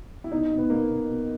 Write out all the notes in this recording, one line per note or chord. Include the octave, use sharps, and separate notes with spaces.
E4
B2 D#4
B2
B3
B2 A#3
B2
B2